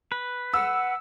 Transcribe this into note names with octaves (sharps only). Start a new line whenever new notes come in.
B4
F#5 E6